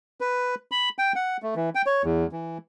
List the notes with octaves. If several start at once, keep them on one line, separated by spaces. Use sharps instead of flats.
B4
B5
G5
F#5
A3
E3
G5
C#5
E2
E3